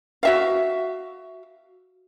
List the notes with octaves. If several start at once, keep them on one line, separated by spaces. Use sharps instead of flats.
F#4 E5 F5